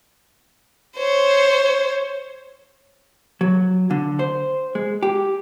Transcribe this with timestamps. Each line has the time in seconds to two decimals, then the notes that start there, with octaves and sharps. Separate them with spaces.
0.98 C5 C#5
3.41 F#3
3.91 D3
4.19 C5
4.75 G#3
5.03 G4